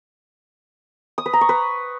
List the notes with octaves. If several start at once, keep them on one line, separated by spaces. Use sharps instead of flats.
D#6
B4
A#5
C#6
B4